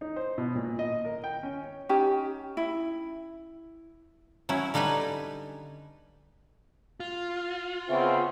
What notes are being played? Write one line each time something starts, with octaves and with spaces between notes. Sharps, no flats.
D#4
C5
B2
A#2
D#5
A#4
G5
C#4
C#5
C#4 D#4 G4
E4
F#3 C#4 E4
D3 G3 D#4 B4 G#5
F4
C#3 B3 C4 E5